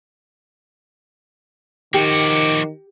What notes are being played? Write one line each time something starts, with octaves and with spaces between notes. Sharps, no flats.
D#3 F3 F#4 G4 D6